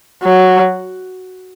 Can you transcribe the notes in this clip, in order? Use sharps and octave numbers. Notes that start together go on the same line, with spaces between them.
F#3